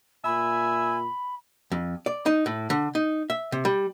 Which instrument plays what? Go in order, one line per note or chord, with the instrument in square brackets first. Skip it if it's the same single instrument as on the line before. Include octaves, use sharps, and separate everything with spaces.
[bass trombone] A#2 [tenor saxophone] E5 [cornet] G#5 [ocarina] B5
[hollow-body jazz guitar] F2
D5
D#4
A2
D3
D#4
E5
C3
G3